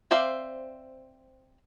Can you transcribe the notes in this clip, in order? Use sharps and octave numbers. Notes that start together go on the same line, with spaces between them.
C4 C5 D5 E5 F5